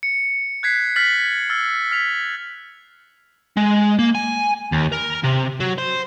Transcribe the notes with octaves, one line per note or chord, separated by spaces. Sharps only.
C#7
F#6 G#6 B6 C7
F6 A6 B6 F#7
E6 F6 A6
F6 B6 F7
G#3
A#3
G#5
D#2
A#4
C3
F#3
C5